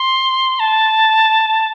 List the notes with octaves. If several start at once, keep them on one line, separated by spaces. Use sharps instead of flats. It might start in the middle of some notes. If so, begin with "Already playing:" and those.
Already playing: C6
A5